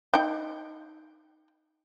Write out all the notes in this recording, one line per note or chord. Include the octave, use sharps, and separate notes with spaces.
D#4 G5